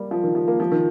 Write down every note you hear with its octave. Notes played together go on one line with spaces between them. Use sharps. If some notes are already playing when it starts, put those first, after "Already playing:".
Already playing: G3 A#3
F3
D#3
F3
A#3
F3
D#3